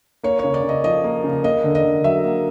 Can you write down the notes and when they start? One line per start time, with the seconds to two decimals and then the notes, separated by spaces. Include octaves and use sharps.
0.23 A#3 C#5
0.39 C#3 C#5
0.54 D5
0.63 C#3
0.69 D#5
0.84 F3 D#5
1.04 A#3
1.24 C#3
1.44 A#3 D#5
1.64 D3
1.75 D#5
1.84 D3
2.04 F#3 E5
2.25 A#3